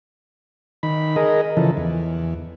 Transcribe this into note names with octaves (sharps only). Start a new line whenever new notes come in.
D#3 B5
G#4 A#4 D#5
C#3 E3 F3 A4
E2